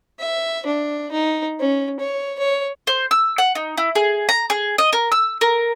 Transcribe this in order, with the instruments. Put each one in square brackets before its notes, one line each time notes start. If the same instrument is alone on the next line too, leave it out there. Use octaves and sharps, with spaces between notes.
[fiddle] E5
D4
D#4
C#4
C#5
C#5
[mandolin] C5
E6
F#5
D#4
E4
G#4
A#5
G#4
D#5
A#4
E6
A#4